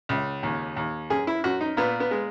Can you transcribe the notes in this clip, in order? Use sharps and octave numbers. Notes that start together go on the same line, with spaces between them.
C#2
D#2
D#2
F#2 G#4
E4
F#2 F#4
D#4
A#2 B3
B3
G#3